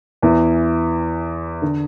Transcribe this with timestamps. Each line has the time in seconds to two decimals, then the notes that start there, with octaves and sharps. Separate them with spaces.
0.22 E2 E3
1.62 D3